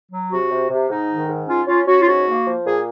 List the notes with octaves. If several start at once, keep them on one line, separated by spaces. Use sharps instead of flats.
F#3
C3 F#4
C3
C3
G#2 D#4
D#3
G#2
C#4 F4
C#4 F4
C#4 F#4
F4
G#2 F#4
A#3
F3
A#2 G#4